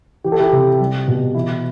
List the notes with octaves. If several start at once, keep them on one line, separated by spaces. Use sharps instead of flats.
E3 G4
A4
E4 G4
C3
G3
B2
E3 E4